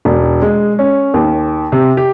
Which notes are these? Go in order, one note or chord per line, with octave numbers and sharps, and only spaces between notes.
E1
G#3
C#4
D#2
C3
G4